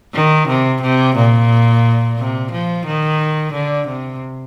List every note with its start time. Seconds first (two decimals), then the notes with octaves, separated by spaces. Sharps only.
0.14 D#3
0.48 C3
0.82 C3
1.16 A#2
2.18 C3
2.52 F3
2.86 D#3
3.53 D3
3.88 C3